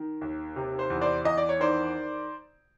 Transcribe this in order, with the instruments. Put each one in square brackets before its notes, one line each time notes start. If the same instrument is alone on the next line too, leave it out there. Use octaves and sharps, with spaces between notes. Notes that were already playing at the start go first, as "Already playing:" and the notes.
Already playing: [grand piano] D#3
D#2
C3
C5
E2
C5 D5
E2 D#5
D5
C#5
D#3 C5 D5